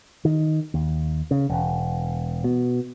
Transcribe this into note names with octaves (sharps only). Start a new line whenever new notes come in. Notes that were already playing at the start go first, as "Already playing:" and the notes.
D#3
D#2
C#3
E1
B2